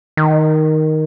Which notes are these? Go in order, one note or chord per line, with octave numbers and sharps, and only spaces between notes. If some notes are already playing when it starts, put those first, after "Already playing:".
D#3